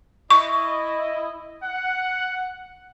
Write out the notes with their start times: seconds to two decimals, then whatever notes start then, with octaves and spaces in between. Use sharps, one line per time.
0.30 E4 D#5 C#6
1.63 F#5